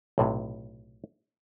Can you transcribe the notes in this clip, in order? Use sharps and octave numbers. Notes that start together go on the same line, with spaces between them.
B1 A2 C3